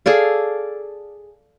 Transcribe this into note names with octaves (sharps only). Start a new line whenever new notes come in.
G#4 A4 D5 F5